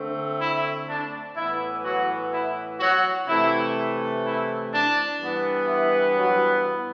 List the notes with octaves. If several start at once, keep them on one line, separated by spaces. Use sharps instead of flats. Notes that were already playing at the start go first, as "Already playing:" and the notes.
Already playing: D3 A3 C4
E4
D4
A2 E3 B3 E4
F#3 F#4
E4
F#3 F#4
C3 E3 A3 E4
E4
D4
G2 E3 B3
E4
F#3 F#4